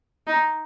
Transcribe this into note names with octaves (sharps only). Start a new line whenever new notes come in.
D#4